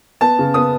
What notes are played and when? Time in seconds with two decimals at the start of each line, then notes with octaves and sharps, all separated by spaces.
0.21 B3 A5
0.39 C#3
0.54 B3 D#6